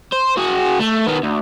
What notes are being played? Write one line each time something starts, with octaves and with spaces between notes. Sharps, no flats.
C5
F#4 G#4
A3
D#3 B3
D2